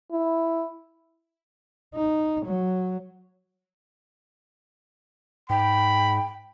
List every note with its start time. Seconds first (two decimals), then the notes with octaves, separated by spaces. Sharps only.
0.11 E4
1.95 D#4
2.46 F#3
5.50 G#2 G5 B5